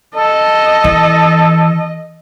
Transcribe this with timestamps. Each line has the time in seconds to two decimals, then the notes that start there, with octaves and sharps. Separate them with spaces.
0.15 A4 D#5
0.84 E3